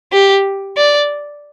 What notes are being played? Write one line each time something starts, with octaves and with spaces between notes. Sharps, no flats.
G4
D5